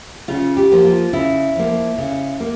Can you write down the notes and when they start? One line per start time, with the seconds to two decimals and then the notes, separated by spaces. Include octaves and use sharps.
0.28 C#3 F4
0.57 G4
0.72 F3 A#3
0.84 F4
1.13 C#3 E4
1.56 F3 A#3
1.98 C#3
2.40 A#3